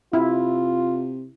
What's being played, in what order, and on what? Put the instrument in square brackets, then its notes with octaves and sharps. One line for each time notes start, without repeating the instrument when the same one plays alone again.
[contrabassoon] C3 [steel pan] E4 [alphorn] F4